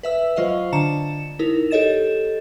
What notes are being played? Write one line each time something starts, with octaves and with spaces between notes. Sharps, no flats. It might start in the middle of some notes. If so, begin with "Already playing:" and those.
B4 E5 E6
F#3 F4 C5 D#5 F5
D3 D4 A5 A#5 C#7 E7
D#4 E4 A#4
G4 A4 C#5 D#5 A6 E7